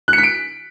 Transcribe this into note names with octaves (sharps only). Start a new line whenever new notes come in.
F#6
C#7
B6
D7